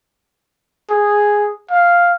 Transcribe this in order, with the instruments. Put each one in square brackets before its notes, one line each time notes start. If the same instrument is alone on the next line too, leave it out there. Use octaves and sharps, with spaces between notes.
[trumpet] G#4
F5